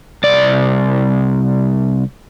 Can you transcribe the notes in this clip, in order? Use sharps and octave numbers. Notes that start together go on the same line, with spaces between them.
C2 D5